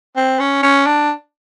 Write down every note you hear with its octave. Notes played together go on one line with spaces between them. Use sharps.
C4
C#4
C#4
D4